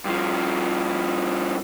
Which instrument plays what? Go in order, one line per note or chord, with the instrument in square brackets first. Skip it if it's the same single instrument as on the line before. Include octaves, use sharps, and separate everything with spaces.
[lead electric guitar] G2 F3